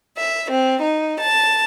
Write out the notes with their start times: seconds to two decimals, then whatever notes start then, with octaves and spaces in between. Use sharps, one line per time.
0.16 E5
0.50 C4
0.81 D#4
1.19 A5